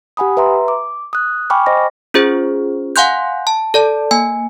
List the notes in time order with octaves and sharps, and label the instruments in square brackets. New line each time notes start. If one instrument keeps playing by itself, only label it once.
[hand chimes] G4 F#5 G#5 B5 D#6
B4 E5 A#5 C6
D6
D#6 F#6
G5 G#5 B5 C#6 D6 F6
C5 D#5 A#6
[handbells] C#4 F4 G#4 C5
F5 F#5 G#5 C6 F#6 G6
A5
A4 D5 A5
A#3 G#5